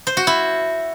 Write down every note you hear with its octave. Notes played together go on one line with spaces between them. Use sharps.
C5
F#4
E4